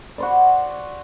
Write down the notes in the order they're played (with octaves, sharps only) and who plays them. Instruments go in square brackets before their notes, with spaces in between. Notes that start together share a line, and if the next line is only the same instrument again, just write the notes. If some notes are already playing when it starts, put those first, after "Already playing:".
[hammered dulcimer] F#4 C5 D5